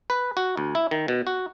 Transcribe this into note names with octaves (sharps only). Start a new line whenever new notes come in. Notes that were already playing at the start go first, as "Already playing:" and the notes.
B4
F#4
D2
E4
D#3
B2
F#4